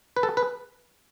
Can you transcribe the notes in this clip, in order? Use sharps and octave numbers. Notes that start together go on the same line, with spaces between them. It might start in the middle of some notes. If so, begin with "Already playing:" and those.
B4
A4
B4